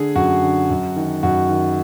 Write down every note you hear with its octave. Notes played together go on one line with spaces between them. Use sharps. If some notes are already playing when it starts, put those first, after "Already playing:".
Already playing: D3 G#4
F#2 F#4
D3
F#2
D#3
F#2 F#4
D#3